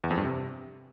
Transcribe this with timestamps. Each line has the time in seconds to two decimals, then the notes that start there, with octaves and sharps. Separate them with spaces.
0.04 E2
0.11 F2
0.17 G2
0.24 C3